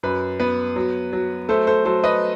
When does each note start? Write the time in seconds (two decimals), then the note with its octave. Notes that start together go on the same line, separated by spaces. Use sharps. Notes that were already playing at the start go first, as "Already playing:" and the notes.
0.03 F#2 B4
0.40 B3 B4
0.76 F#3
1.13 F#3
1.49 A3 A4 C5
1.67 A4 C5
1.85 F#3 A4 C5
2.04 B4 D#5